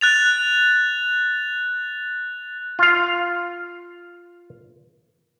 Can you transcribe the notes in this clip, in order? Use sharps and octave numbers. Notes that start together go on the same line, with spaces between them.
F#6 A6 F7
F4 F5